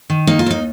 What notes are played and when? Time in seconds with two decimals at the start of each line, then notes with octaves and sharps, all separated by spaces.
0.10 D#3
0.27 A#3 D#4
0.39 F4
0.46 D#2 D#4